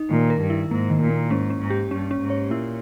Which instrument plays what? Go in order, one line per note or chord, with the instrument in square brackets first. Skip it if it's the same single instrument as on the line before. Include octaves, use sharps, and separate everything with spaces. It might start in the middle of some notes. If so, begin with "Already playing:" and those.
Already playing: [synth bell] D#4
[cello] A#2 [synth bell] D#3
[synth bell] A#4
[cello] G2
[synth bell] E4
[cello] G#2 [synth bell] A#3
[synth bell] D#3
[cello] A#2
[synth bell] A#3
[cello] G#2 [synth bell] C#4
[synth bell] C#4
[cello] G#2
[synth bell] G4
[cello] G2 [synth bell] C#4
[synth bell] C#4
[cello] G#2
[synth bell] C#5
[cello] A#2 [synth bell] E4